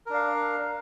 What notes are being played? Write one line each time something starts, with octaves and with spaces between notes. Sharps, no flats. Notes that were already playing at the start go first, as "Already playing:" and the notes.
D4 A#4 F5